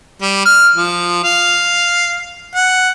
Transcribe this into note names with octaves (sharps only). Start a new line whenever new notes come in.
G3
F6
F3
F5
F#5